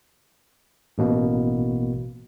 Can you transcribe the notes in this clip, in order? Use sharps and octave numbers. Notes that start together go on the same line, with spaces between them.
A1 B2 A#3